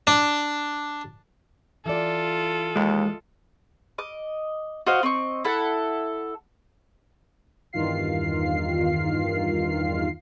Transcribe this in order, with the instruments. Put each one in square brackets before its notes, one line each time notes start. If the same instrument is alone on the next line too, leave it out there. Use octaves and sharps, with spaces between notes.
[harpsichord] D4
[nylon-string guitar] E3 D5 [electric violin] F4 A4
[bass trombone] D#2 [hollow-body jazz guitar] G#3
[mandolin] D#5 D6
F#4 C5 D#5 F5
C4 D#5 C#6
E4 A4 F#5
[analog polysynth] E2 G2 D#3 F4 F5 C7